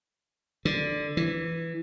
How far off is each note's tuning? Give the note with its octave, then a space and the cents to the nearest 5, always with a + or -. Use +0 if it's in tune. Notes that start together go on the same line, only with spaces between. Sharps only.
D3 +5
E3 +5